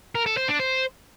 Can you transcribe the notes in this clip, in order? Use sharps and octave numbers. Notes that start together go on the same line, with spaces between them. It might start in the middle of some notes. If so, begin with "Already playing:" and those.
A#4
A4
C5
D4
C5